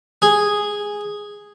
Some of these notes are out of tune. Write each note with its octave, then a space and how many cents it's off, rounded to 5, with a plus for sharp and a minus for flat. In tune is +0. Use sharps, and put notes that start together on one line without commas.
G#4 -5